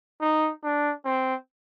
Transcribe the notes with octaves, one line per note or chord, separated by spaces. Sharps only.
D#4
D4
C4